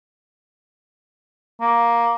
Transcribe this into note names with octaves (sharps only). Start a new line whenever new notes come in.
A#3